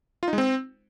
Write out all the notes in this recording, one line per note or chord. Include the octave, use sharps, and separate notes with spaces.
F4
D#4
G#3
C4